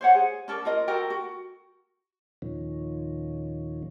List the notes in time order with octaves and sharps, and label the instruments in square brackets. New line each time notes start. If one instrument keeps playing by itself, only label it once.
[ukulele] C5 C#5 F#5
G#4
C#4 A4 A#4 D5
F4 A#4 D#5
F#4 A4 A#4 G5
F#4
[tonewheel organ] D#2 A#2 D#3 F3 C#4